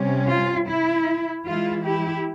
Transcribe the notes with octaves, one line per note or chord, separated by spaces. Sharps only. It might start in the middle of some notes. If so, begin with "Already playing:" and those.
Already playing: C3 G3 C#4
F4
E4
E3 G#3 E4 F4
E4 G4